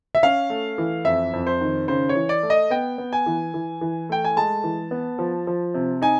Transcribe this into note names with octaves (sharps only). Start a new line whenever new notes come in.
E5
C#4 F5
A3
E3
F2 E5
F2
C5
D#3
C#3 C5
C#5
E3
D5
A3
D#5
B3 G5
B3
G#5
E3
E3
E3
A3 G5
G#5
G#3 A5
E3
B3
F3
F3
C3
D#4 G#5